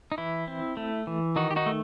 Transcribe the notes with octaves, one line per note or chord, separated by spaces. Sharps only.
D#4
E3 E4
C4
A3
E3
D#3 D#4 F#4
G4
D#4 F#4
A3